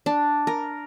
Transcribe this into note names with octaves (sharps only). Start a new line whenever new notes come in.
D4
A#4